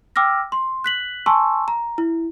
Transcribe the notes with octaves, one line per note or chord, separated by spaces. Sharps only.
G5 D6 E6 F6 A#6
C6
F#6 B6 F#7
G#5 A5 C6 C#6 E6
A#5
E4